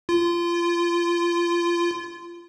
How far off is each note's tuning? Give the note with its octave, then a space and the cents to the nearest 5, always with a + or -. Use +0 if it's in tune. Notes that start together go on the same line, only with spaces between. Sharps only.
F4 -25